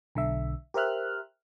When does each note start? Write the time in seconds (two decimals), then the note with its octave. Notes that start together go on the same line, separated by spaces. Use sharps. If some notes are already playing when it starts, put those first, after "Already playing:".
0.15 B1 D3 E5
0.74 G4 A#4 C5 E5 F6 F#6